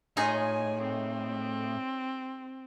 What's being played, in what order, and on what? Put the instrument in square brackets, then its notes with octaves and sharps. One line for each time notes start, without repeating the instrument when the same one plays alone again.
[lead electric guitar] A2 [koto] D#4 G#4 [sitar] F4 C#5 D#5 [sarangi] G#5
[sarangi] C4